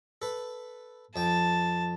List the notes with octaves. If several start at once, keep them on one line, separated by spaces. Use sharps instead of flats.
A4 B4
F2 G5 A5